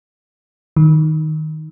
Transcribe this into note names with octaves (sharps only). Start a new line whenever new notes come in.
D#3